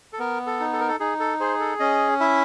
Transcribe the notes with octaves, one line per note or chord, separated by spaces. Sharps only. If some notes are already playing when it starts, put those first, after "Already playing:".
A4
B3 A#4
A4
D#4
A4
A#4
A4
D#4 G#4
A4
G#4 C5
A4
C#4 D#5
E4 E5